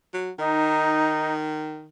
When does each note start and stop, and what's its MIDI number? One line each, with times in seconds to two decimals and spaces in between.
0.14 0.31 54
0.39 1.88 51
0.39 1.34 63